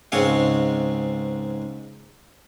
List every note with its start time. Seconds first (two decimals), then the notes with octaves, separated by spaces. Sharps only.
0.12 C#2 G#2 G#3 C4 C#5 F5